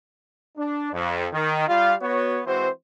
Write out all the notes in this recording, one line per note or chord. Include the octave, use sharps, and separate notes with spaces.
D4
F2
D#3
G3 F4 F5
B3 F#4 C#5
E3 G#3 C4 F#4 C5